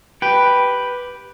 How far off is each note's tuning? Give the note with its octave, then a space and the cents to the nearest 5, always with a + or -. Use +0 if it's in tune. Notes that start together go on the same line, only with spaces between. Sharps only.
G4 +0 B4 +0 G5 +0